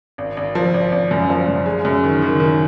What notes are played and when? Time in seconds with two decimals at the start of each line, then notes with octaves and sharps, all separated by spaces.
0.18 G#1
0.37 G#1
0.55 F3
0.74 G#1
0.92 G#1
1.11 F#2
1.30 F3
1.48 F#2
1.66 G#3
1.85 F#2
2.04 D#3
2.22 D#3
2.40 D#3